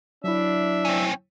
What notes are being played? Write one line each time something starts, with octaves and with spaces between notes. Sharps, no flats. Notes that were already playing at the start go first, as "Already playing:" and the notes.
F#3 D4 E4 E5
C4 C#4